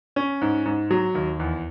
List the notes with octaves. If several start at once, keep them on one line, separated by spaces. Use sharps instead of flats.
C#4
G#2
G#2
F#3
D#2
E2